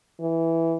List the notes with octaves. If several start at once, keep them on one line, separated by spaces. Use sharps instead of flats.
E3